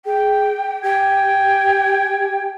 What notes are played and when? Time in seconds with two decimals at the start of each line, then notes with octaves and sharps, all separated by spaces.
0.05 G#4 G5
0.83 G4 G5 G#5